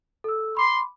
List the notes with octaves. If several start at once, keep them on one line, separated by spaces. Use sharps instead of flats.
A4 E6
B5 C6 D6